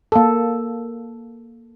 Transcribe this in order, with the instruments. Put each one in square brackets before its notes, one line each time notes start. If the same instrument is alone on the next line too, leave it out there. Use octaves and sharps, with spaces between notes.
[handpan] A#3 A4